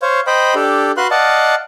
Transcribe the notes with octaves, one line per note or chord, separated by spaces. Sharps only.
C5 C#5 F5
C5 D#5 G5 B5
D4 G4 A4
F#4 B4 F5 C6 F#6
D5 D#5 F5 F#5 A5